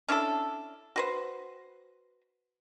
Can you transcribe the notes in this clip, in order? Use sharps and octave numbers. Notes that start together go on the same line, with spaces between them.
C#4 D4 E4 A4
F#4 B4 C5